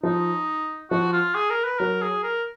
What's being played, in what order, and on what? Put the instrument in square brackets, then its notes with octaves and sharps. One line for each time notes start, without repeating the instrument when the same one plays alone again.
[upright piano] F3 [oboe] D#4
[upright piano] F3 [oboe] F#4
[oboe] F4
G#4
A#4
B4
[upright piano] F#3 [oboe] A#4
[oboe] G#4
A#4